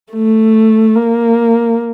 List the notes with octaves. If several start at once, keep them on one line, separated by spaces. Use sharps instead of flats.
A3
A#3